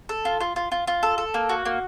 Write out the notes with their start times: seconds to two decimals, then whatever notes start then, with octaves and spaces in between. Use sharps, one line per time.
0.09 A4
0.25 F4
0.40 F4
0.56 F4
0.72 F4
0.87 F4
1.03 A4
1.18 A4
1.34 A#3
1.49 F#4
1.66 A#3